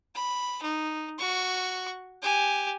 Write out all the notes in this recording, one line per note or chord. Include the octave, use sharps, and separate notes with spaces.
B5
D#4
F#4 C#6
G4 G#5